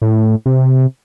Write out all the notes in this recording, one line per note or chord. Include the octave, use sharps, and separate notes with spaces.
A2
C3